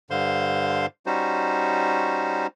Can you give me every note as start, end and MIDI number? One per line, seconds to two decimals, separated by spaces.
0.11 0.86 43
0.11 0.86 50
0.11 0.86 72
0.11 0.86 77
0.11 0.86 84
1.06 2.47 55
1.06 2.47 61
1.06 2.47 63
1.06 2.47 66
1.06 2.47 72